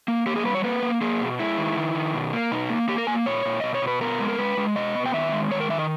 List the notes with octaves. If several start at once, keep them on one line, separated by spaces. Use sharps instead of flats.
A#3
A#3 G4
G#4
G3 B4
C#5
A#3 B4
A#3
A#3 G#4
B2
G#3 E4
D#3
D#3
D#3
B2
A#3
B2 D#4
A#3
A#3 G4
A#4
A#3 G#5
A#2 C#5
A#2
B2 D#5
C#5
B2
B4
B3 A#4
G#3
A#4
G#3 B4
G#3
B2 D#5
B3
G5
D#3 E5
G#3
D#3 C#5
A#4
D#3 E5
D#5